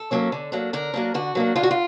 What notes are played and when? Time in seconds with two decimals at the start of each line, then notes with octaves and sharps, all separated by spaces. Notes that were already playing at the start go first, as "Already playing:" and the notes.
Already playing: A4
0.11 F#3 A#3 C#4
0.32 D3
0.52 F#3 A#3 D4
0.73 D3 A#4
0.94 F#3 A#3 D4
1.14 D3 F#4
1.35 F#3 A#3 D4
1.56 D3 F4
1.63 F#4
1.71 F4